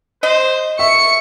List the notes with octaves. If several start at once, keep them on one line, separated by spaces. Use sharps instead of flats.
C5 D#5
E5 C#6 C#7